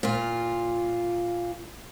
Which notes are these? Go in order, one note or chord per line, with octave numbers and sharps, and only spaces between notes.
A#2 F4